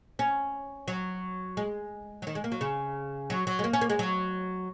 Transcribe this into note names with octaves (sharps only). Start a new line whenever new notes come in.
C#4
F#3
G#3
F#3
D#3
G#3
A#3
F#3
C#3
F#3
F#3
G#3
A#3
C#4
A#3
G#3
F#3